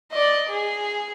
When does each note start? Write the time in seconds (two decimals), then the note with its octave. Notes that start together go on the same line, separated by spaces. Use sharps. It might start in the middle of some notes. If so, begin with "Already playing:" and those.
0.12 D5 D#5
0.49 G#4